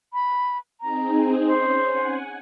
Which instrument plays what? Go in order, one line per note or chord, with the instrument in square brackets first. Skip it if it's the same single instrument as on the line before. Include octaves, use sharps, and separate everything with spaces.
[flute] B5
[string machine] C4 D#4 G#4 [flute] A#5
[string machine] C#4 [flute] C5
[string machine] F#5 G#5